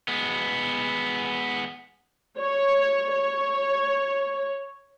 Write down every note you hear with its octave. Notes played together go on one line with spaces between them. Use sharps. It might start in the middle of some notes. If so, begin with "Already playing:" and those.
G#3 B3
C#5
C#5